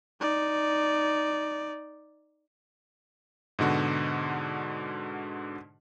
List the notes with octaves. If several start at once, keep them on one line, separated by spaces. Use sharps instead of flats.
D#4 D5
G#2 B2 D3 F#4